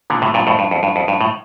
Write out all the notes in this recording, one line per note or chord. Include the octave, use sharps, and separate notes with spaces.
A#2 D3
A2 C3
G2 A#2
F2 A2
G2
F2
G2
F2
G2
A2